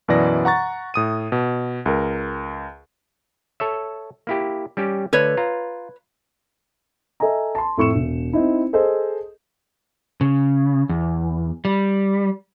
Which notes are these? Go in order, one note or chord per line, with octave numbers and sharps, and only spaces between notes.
F#2 B2 E3 D5 A#6
F#5 A#5 C#6 A6
A2 D#6 D#7
B2
C#2 A#4
A4 C#5 E5
A#3 E4 G4
G3 C#4 G4
D3 A3 B4 C#5
F4 A#5
A4 D#5 E5 G#5 A#5
A5 C6
F2 A2 C#6 C#7 E7
E1
C4 D#4 E4
G#4 A4 C5 D#5
C#3
E2
G3